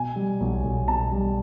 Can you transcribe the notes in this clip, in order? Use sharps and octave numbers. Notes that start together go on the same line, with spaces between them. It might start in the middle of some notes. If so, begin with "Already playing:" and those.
Already playing: B2 G#5
G3
B1
B1
B2 A5
G3